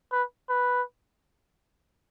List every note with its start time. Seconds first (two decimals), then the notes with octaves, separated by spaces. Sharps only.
0.12 B4
0.49 B4